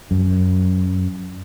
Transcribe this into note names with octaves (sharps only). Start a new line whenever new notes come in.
F#2